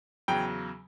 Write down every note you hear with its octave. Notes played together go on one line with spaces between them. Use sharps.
E2 C#3 F#3 G5